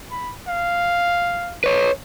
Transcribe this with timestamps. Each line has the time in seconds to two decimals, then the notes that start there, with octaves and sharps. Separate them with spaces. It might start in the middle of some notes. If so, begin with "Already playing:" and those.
0.11 B5
0.48 F5
1.64 B4 C#5